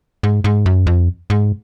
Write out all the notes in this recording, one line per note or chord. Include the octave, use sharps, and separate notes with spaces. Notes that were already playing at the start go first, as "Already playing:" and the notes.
G#2
G#2
F#2
F2
G#2